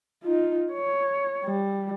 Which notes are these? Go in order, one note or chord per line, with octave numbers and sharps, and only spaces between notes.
D#4 F4
C#5
G3